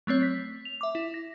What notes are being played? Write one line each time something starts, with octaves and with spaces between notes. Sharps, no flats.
F#3 A3 C4 C#5
B6
F7
E5 D6
E4
A#6